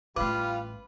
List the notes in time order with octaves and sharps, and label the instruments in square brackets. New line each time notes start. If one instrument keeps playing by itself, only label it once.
[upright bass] A1 A3 [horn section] G3 F4 F5 [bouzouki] B4 [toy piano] D6